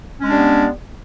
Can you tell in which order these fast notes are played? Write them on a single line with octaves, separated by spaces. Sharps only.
C#4 G#3 D4 G3 B3